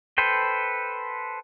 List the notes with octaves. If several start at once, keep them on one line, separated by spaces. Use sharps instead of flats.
A4 B4 C5 G5